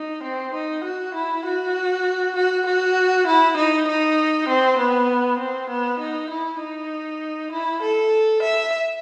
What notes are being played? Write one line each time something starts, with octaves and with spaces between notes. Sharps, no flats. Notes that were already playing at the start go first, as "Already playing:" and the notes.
Already playing: D#4
C4
D#4
F#4
E4
F#4
F#4
F#4
E4
D#4
D#4
C4
B3
C4
B3
D#4
E4
D#4
E4
A4
E5